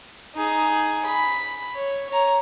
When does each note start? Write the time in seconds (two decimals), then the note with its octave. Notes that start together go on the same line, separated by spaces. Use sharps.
0.35 D#4 G#4
1.06 B5
1.74 C#5
2.09 C#5 A#5